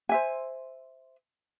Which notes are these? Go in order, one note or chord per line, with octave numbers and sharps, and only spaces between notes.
C5 E5 G#5